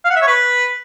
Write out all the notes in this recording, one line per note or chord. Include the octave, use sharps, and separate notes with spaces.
F5
F#5
E5
C#5
B4